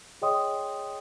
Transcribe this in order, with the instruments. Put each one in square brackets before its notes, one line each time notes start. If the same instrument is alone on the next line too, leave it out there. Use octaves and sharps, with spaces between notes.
[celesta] G#4 C#5 D#5 G5 C6 D#6